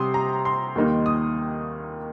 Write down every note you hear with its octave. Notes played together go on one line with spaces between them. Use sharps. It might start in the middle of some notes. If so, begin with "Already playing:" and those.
Already playing: C3 G3 C4 C6 D#6
A#5
C6
D#2 D#3 G3 A#3 D#4
D#6